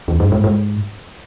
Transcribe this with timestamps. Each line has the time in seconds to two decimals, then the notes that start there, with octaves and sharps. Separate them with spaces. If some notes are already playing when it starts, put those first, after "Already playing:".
0.08 E2
0.20 G2
0.32 G#2
0.44 G#2